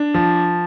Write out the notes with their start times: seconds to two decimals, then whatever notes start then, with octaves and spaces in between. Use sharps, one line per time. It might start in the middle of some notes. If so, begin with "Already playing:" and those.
Already playing: D4
0.14 F3